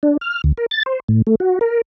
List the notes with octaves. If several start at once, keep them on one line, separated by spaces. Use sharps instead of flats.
D4
F6
D2
A#4
A6
C5
A2
A3
F#4
A#4